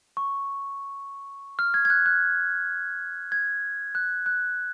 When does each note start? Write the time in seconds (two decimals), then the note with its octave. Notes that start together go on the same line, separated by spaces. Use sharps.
0.17 C#6
1.59 F6
1.74 G#6
1.85 G#6
1.90 F#6
2.06 F#6
3.32 G#6
3.95 F#6
4.26 F#6